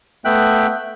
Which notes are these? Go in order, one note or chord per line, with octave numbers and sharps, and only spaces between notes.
A3 B3 E5 G5 F#6